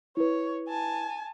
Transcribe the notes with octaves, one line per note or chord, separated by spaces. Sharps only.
E4 B4 C#5
G#5 A5